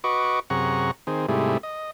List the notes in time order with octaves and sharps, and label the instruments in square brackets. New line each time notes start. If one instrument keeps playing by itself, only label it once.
[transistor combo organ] F#4 B4 D#5 C#6 D6
F#2 C3 G#4 F#5 A#5 C#6
D#3 C4 G#4
G#2 C3 G3 A3 E4 G#4
D#5